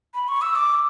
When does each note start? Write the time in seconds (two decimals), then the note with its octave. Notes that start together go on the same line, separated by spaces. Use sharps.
0.14 B5
0.28 C#6
0.42 E6
0.55 D6